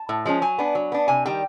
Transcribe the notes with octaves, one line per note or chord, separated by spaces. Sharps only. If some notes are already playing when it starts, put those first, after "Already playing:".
Already playing: A5
A2
F3 G#3 C#4
F#3 G#5
B3 D4
F#3
B3 D4
C3 G#5
D#3 G3 G5